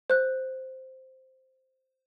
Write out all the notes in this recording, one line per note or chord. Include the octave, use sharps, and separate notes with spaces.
C5 F#6